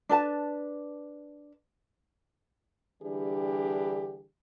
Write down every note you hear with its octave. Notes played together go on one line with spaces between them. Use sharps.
D4 B4 A5
D3 E3 G3 D4 G4 G#4